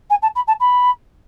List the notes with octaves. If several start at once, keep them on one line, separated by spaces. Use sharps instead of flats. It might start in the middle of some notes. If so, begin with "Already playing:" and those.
G#5
A5
B5
A5
B5